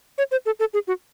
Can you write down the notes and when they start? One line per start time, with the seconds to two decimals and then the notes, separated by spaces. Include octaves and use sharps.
0.18 C#5
0.31 C5
0.46 A4
0.60 A4
0.74 G#4
0.87 F#4